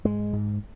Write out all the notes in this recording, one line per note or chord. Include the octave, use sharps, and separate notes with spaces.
G#2 G#3
G#2